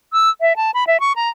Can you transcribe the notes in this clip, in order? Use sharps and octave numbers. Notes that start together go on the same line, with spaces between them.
E6
E5
A5
B5
E5
C#6
A#5